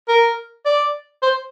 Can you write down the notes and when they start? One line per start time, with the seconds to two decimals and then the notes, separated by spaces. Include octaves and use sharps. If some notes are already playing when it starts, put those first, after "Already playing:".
0.09 A#4
0.66 D5
1.23 C5